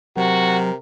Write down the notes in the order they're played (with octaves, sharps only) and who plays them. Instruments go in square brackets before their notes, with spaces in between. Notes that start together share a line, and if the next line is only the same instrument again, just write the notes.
[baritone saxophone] C3 [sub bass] F#3 [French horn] F#4 [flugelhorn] A#4